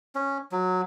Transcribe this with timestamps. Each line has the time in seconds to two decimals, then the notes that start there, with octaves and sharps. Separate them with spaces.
0.15 C#4
0.52 F#3